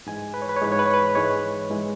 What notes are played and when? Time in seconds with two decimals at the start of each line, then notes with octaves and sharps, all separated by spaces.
0.07 G#2 E3 G#3 G#5
0.34 B4
0.42 C#5
0.49 B4
0.57 C#5
0.62 G#2 E3 G#3 B4
0.72 C#5
0.79 B4
0.86 C#5
0.94 B4
1.15 G#2 E3 G#3 C#5
1.70 G#2 E3 G#3